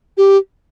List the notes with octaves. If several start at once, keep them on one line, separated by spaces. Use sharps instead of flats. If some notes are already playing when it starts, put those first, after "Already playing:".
G4